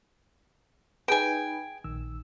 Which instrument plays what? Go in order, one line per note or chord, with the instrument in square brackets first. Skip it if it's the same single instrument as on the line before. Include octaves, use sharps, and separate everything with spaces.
[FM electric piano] D#4 G#4 B4 [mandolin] G5 G#5
[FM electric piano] A#1 D#3 E6